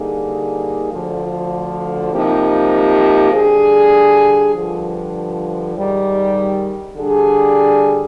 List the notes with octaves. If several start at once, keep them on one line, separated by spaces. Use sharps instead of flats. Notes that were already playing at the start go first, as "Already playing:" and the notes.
Already playing: D3 G3 A#3 D#4 G#4
D2 D3 F3
C3 F3 A#3 D#4 G4
D3 G3 D4 G#4
G2 D3 F3
G#2 D#3 G3
D3 G3 D4 G#4